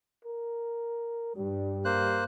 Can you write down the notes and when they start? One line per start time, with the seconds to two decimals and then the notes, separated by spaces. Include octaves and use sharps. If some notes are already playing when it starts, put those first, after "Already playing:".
0.25 A#4
1.36 G2 G3
1.85 A#3 C5 F#6